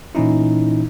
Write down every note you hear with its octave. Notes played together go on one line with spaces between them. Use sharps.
A#2 E3 C#4 D#4 E4